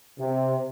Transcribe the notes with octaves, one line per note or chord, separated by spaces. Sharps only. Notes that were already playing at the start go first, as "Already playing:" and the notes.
C3